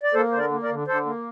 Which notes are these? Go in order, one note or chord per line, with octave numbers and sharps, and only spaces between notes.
D5
A#3 A4 C5
D3 C5
A#4 D5
A#3
A#4 D5
D3
D3 A4 C5
A#3